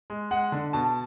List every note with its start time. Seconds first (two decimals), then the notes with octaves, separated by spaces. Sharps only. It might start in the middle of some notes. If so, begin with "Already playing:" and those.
0.10 G#3
0.31 G#3 F#5
0.52 D3
0.73 B2 A5